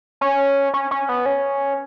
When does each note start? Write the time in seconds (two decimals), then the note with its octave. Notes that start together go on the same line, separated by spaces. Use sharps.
0.21 C#4
0.73 C#4
0.91 C#4
1.09 B3
1.26 C#4